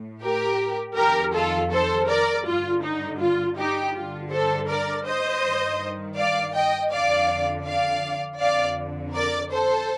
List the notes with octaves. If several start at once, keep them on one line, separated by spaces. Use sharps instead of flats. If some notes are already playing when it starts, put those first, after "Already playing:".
Already playing: A2
G4 A#4
F2 D#3 G4 A#4
F4 A4
A4 C5
A#4 D5
G2 D3 F4
D#4
F4
D#4 G4
G2 D3 F4
A4 C5
A#4 D5
C5 D#5
G2 D#3
D5 F5
D#5 G5
F2 D3 D5 F5
D5 F5
F2 D3 D5 F5
A#4 D5
A4 C5